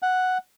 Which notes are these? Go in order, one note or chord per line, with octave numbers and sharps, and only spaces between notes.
F#5